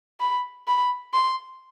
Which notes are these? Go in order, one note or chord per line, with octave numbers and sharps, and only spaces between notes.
B5
B5
C6